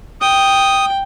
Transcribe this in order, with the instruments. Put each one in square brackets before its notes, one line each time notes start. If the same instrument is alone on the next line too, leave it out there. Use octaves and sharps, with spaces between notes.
[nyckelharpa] G5 [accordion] D#6